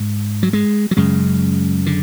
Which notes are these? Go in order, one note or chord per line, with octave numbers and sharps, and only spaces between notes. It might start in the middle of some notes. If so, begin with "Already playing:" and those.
Already playing: G#2
F#3
G#3
F#3
F#2 C#3 G#3
D3